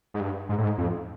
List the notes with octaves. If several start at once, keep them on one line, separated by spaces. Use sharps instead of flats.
G#2
G2
G#2
A2
G#2
F2